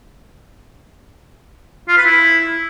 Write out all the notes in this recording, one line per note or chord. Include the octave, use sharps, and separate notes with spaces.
F4
B4
E4